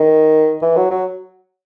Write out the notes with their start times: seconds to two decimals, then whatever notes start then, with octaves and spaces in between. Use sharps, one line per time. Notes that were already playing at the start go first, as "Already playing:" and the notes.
Already playing: D#3
0.62 E3
0.77 F#3
0.91 F#3